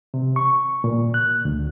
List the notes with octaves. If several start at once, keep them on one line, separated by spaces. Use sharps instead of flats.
C3
C#6
A#2
F#6
D2